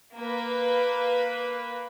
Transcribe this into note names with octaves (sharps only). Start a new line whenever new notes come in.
A#3 B4